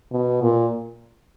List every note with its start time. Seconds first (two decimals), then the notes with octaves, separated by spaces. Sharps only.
0.12 B2
0.42 A#2